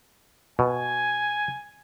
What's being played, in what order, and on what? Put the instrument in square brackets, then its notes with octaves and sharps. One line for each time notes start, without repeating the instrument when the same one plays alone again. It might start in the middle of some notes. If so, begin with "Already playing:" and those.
[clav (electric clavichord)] B2 [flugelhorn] G#5